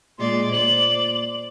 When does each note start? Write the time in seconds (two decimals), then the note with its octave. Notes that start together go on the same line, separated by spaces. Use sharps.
0.18 A#2 G#3 D5 C6
0.52 C5 D5 F#7